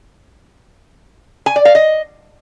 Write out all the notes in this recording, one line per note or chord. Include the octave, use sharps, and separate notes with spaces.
G#5
D5
F5
D#5